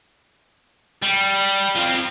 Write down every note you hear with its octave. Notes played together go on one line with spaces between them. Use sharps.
G3
F3 C4